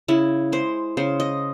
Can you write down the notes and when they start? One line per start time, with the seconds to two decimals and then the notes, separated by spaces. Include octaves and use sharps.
0.08 C#3 E4
0.52 G#3 C5
0.97 C#3 C5
1.20 D#5